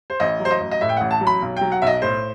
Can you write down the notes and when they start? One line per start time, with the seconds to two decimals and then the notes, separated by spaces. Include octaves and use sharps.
0.10 C5
0.20 A1 D#5
0.40 F#3
0.45 C5
0.51 D#5
0.61 A1
0.71 D#5
0.81 A2 E5
0.89 G5
0.97 A1 F#5
1.11 A5
1.21 F#3
1.27 B5
1.42 B1
1.57 F#3 G5
1.72 F#5
1.82 B1 D#5 E5
2.02 A2 C5